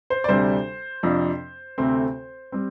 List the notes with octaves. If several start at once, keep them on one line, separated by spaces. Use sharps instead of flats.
C5
D5
D2 C3 G3 D4 C5
F2 C3 F3 D4
D2 C3 A3 C4
G3 C4